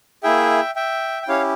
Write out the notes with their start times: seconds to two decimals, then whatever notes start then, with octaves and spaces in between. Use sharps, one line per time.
0.23 A#3 E4 G#4 E5 G5
0.76 E5 G5
1.23 G5
1.28 C#4 E4 G4 C#5 F5